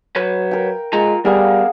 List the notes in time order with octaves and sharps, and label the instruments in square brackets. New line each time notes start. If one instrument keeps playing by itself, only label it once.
[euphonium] F#3 [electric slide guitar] B4 C#5
[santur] A#4 G5
[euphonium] G#3 [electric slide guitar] F4 A#5
[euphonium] G3 [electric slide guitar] B3 A#4 [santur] G#4 F5 F#5